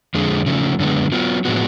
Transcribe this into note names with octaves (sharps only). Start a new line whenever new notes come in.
F2 D3 G#3
C#3 F3 A3
F#2 D3 G#3 B3
F#3 B3 F4
A2 F3 G#3 B3 F#4